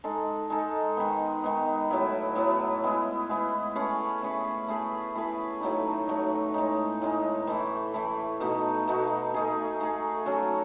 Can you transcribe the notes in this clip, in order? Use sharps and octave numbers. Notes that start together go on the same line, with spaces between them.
G#3 D#4 A4
G#3 D#4 A4
D#3 G#3 B3
D#3 G#3 B3
A2 F#3 B3 E4
A2 F#3 B3 E4
G#3 B3 E4
G#3 B3 E4
A3 C#4 G#4 B4
A3 C#4 G#4 B4
A3 E4 G#4 B4
A3 E4 G#4 B4
A2 F#3 A3 D#4
A2 F#3 A3 D#4
A2 G#3 D#4
A2 G#3 D#4
E3 A3 E4
E3 A3 E4
B2 A3 D#4 F#4
B2 A3 D#4 F#4
A3 D#4 G#4
A3 D#4 G#4
F#3 C#4 F#4 A4